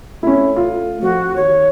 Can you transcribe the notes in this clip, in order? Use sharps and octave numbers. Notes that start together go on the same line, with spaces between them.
A3 C#4 E4
F4
F2 F#4
D#2 C#5